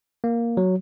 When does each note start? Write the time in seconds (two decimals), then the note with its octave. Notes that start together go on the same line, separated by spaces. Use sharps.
0.24 A#3
0.57 F#3